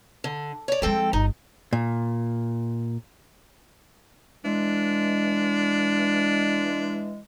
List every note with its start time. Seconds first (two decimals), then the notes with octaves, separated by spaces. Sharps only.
0.24 D3
0.68 C#5 D5
0.82 F3 G#3 C4 A4 G5
1.13 G1 D#4
1.73 A#2
4.45 E3 G#3 D4